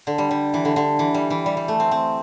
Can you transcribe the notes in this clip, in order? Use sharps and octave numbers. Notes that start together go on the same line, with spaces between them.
D3
G3
G3
E3
D3
D3
E3
G3
E3
G3
G3
A3
C4
C4